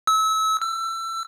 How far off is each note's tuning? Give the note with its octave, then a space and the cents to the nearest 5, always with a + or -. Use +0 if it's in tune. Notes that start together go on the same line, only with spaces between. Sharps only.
E6 -30
E6 +25